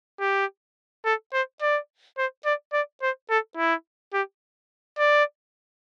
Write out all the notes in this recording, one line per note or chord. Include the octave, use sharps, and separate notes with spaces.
G4
A4
C5
D5
C5
D5
D5
C5
A4
E4
G4
D5